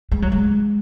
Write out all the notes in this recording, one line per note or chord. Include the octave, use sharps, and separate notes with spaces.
G#3
F#3
G#3